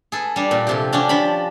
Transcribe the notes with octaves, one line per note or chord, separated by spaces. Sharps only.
G#4 A4 B4
G3 D4
A#2 F#4
F2 C3 G4
C#4 D4 F#4 G4
F3 D4 B5